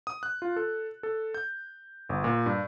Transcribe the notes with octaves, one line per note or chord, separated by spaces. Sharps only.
D#6
F#6
F4
A4
A4
G6
G1
A#2
G2